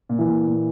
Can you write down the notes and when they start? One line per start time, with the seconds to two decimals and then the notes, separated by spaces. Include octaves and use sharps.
0.09 A#2
0.19 E3
0.28 A#2
0.47 A#2